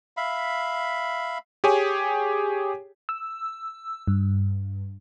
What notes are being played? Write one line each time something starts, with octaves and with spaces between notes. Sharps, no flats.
E5 F5 B5
G4 G#4 C#5 G#5
E6
G2